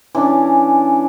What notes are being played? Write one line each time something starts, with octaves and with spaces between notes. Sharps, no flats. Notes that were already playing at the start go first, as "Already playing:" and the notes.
E3 C#4 D4